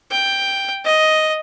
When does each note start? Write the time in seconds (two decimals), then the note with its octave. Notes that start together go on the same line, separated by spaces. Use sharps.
0.11 G5
0.85 D#5